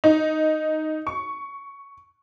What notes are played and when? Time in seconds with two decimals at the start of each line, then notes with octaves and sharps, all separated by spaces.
0.04 D#4
1.07 C#6